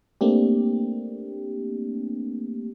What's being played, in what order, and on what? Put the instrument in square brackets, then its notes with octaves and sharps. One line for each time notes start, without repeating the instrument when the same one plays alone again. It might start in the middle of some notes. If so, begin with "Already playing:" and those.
[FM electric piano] A3 A#3 C4 D4 G4